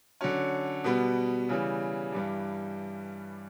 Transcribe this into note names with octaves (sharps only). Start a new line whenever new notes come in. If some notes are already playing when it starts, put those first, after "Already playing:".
D3 F#3 C#4
B2 G3 B3
C#3 E3 G3
G2 E3 G3